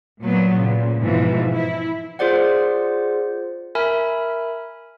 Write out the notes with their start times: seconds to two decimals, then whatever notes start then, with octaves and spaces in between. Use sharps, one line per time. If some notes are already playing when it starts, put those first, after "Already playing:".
0.20 A#2 F#3 B3
0.54 A#2 C#3
1.00 G#2 B2 E3 F3
1.54 E4
2.19 F4 G#4 C5 D5 F#5
3.75 A#4 E5 G#5 B5